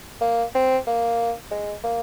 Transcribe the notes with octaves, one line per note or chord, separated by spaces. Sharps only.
A#3
C4
A#3
G#3
A#3